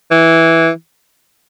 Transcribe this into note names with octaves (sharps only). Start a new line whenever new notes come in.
E3